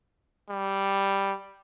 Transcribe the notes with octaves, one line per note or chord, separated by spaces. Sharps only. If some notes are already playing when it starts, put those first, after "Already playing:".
G3